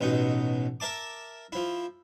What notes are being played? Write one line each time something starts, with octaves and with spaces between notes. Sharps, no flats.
A1 B2 D#4
A#4 E5 A5 D6
F3 E4